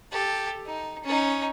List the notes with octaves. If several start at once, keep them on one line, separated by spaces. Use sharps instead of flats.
G4 A4
D#4
C#4 D#4